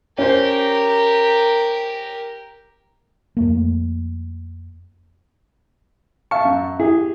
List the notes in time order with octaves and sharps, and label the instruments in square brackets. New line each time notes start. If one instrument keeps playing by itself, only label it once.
[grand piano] C#4 C5 [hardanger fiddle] G4 A#4
[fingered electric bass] F2 A3 A#3
[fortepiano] E5 A5 [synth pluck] F5 C#6
[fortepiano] F#2
[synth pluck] E4 [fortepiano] G4 G#4